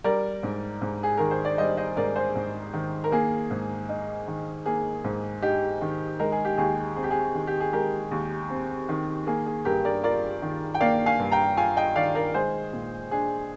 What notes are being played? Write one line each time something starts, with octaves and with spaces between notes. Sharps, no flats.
G3 A#4 D5
G#2
G#2
G#4
D#3 A#4
C5
D5
G3 C5 D#5
C5 D#5
G#2 A#4 D5
G#4 C5
G#2
D#3
A#4
A#3 G#4
G#2
D#4
D#3
A#3 G#4
G#2
D#4 G4
D#3
G#3 A#4
G#4
G4
D#2 G#4
C4 G#4
G4
G#4
D#3
G4
G#4
G#3 G4 A#4
D#2
C4
D#3
A#3 G#4
G#4
G2 G4 A#4
A#4 D5
F4 A#4 D5
D#3
G5
A#3 D5 F5
F5 G#5
G2
G5 A#5
F4 F5 G#5
D#5 G5
D#3 D5 F5
A#4 D5
G#3 G#4 C5
A#2
D4 G#4